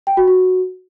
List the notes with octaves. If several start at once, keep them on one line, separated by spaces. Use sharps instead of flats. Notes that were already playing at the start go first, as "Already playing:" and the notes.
G5
F#4
F#4